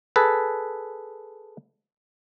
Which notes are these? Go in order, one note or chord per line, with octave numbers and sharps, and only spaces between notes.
G#4 A4 B4